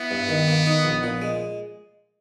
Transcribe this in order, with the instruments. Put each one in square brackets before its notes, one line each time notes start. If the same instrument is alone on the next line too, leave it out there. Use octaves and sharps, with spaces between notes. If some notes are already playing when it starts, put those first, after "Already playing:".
Already playing: [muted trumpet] B3 [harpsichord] E4
[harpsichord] G2
D#3
A#3
D#4
A#1
A#2
G#3